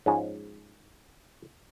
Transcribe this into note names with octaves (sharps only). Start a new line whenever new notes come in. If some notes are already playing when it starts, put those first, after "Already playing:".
G#2 F3 G#3 C#4